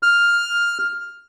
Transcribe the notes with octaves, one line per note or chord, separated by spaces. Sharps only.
F6